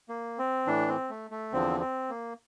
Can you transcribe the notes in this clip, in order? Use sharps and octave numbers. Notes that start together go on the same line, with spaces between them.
A#3
C4
A2 E3 D4
C4
A3
A3
E2 D3 F3 C4
C4
A#3